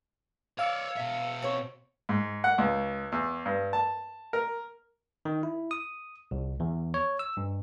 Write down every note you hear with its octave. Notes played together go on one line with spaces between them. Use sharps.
C#5 D5 F5 E6 C#7
B2 E5
C4 C#5
G#2
F#5
C#2
E2
G2
A5
A#4
D#3
E4
D#6
C2
E2
C#5
E6
G2